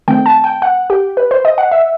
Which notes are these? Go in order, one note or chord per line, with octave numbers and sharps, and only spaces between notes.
D#3 A3 C4 G5
A5
G5
F#5
G4
B4
C5
D#5
F#5
E5